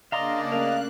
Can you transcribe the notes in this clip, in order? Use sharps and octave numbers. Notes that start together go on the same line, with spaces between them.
C#3 A#3 D4 D5 D#5 F5 A#5 C6
A3 C#4 A#4 F5 F#6